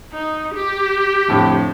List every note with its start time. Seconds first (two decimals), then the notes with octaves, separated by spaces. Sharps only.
0.13 D#4
0.54 G4
1.28 F2 A2 D3